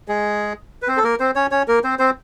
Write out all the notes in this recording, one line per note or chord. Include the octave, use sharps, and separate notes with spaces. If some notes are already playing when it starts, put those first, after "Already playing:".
G#3 G#4
B4
C4 C5
A4
A#3 A#4
C4 C5
C#4 C#5
C#4 C#5
A#3 A#4
C4 C5
C4 C5